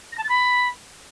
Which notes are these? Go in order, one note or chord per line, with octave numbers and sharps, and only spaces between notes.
A#6
A5
A6
B5